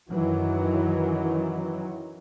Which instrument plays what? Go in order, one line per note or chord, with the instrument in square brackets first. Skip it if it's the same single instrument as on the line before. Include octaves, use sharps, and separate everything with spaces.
[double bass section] F#2 D#3 E3 F#3